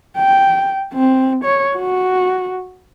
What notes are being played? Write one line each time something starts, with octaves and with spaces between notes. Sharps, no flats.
G5
C4
C#5
F#4